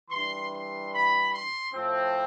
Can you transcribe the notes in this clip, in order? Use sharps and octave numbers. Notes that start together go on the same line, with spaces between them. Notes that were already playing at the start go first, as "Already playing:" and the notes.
E3 G3 D4 C6
C6
B5
C6
A2 F3 C4